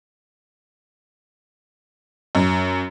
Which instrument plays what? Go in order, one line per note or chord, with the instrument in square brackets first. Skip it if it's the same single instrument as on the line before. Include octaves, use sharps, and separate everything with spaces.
[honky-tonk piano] F#2